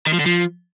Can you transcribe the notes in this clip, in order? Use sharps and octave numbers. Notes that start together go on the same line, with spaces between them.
D#3
F3
D3
F3